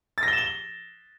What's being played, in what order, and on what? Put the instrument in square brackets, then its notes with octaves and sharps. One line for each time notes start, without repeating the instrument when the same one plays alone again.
[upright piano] A6
A#6
G7
E7
G7